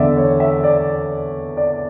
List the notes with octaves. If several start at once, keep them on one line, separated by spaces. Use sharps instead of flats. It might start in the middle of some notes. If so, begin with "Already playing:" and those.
Already playing: E2 D3 D5 E5
C#5
E5
D5
D5